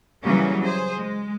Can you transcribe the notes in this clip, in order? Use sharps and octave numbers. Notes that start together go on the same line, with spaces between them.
C#3 E3 F#3 G3 A#3 C#4
G#4 C5
G#3